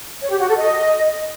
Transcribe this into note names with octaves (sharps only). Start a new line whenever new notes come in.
C#5
G4
F#4
A4
D#5